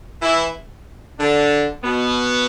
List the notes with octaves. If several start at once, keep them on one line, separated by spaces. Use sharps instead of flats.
E3 E4
D3 D4
B2 B3